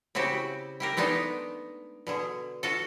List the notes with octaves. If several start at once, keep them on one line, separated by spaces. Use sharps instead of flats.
C#3 C4 E4 F#4 G4
E4 G4 A#4
G#3 A3 B3 D4 D#4
B2 D3 G#4
F4 F#4 A4